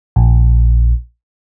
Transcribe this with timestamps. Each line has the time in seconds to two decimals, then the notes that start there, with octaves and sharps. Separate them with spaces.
0.16 A#1